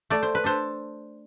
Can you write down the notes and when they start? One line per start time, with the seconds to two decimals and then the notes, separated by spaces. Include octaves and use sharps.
0.10 A3 D5
0.23 C5
0.35 B4
0.44 D4 A4 C5